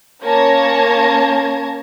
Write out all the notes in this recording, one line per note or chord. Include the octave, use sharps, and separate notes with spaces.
A#3 C#4 C#5 A5 G#6 A#6